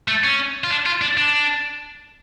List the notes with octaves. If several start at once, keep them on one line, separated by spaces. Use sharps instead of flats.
A3
C#4
F4
D4
F4
D4
D4